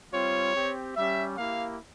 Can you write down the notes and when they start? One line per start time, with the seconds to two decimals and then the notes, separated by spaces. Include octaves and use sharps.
0.12 G3 C4 F4 C#5
0.55 C4 G4
0.95 G3 C#4 G4 E5
1.37 A#3 E4 G4 F5